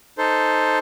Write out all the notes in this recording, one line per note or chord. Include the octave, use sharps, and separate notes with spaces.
D#4 A4 C5